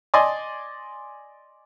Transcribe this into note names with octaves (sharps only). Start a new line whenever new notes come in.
D5 D#5 G#5 C6